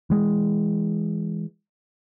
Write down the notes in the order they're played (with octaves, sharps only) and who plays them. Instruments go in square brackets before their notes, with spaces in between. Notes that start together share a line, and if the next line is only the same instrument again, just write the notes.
[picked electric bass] E3 G#3